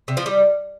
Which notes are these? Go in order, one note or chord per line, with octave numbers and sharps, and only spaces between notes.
C3
F3
G3